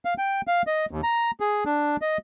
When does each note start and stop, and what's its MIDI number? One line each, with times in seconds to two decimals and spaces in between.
0.05 0.14 77
0.18 0.41 79
0.47 0.62 77
0.67 0.86 75
0.91 1.01 39
1.03 1.31 82
1.40 1.64 68
1.65 1.96 62
2.02 2.18 75